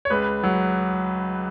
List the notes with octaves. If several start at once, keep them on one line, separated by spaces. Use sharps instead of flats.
C#5
C#2 B4
F#3